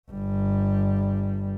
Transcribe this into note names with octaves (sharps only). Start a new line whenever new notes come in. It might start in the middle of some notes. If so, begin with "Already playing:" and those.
G1 G3